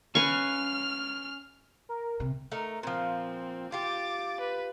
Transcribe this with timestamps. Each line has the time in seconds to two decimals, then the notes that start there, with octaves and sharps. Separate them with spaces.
0.15 C#4 B4 F5 C#6 F6
1.89 A#4
2.20 C3
2.52 A3 D#4 A#4
2.83 A#2 F3 C4
3.72 F4 G4 D6 A6
4.40 B4